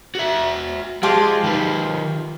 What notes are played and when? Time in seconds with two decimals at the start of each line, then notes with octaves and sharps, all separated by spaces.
0.15 F#4 E5
1.03 F3 G#3 F4 G4
1.44 D#3 B4